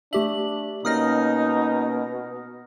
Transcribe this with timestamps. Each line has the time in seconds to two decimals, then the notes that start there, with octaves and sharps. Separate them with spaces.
0.13 A3 D4 G4 E5 F#7
0.85 B2 A#3 C#4 D#4 D#6 F6 A#6